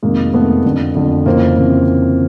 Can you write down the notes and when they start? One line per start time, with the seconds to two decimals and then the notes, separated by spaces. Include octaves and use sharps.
0.03 F2 C3 D#3 G#3 A#3
0.33 F2 C3 D#3 A3 B3
0.65 F2 D3
0.95 F2 D3
1.26 F2 C#3 E3 A#3 C4
1.56 F2 C#3 E3